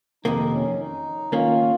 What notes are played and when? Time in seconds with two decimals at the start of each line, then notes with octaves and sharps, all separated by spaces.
0.25 F2 C3 D#3 A#3 D#4
0.52 C#4
0.79 D#4
1.32 D#3 A#3 C#4 F4